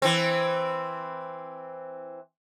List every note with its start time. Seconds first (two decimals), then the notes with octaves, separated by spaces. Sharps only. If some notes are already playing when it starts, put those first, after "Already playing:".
0.02 E3 C4